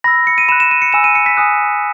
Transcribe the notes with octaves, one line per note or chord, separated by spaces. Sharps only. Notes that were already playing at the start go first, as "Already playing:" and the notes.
B5 E6 A#6
C#7
D#7
B5 F#6 E7
E7
D#7
C#7
G#5 B5 E6 E7
D#7
C#7
B6
G#5 D#6 F#6